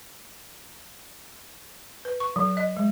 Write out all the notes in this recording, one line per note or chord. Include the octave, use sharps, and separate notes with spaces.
B4
C#6
F#3
D#5
G#3